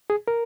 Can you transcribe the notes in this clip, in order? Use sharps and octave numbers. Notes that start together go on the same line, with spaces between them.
G#4
A#4